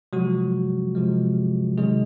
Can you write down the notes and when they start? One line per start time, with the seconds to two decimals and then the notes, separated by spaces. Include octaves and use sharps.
0.13 C3 F3 F#3 G#3 F#4
0.95 C3 F3 G#3
1.78 C3 D#3 F#3 G#3 G#4